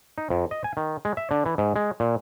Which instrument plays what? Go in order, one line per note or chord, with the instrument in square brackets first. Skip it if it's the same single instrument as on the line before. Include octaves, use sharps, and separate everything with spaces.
[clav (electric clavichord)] D#4
F2
D#5
G#5
D#3
G#3
E5
D3
E3
G#2
G#3
A#2